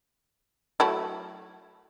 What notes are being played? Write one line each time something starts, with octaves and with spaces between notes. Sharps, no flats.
F#3 A3 E4